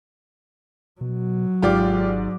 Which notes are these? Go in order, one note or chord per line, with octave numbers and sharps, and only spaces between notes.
B2 F#3
G#1 G#2 F4 G4 D5 D6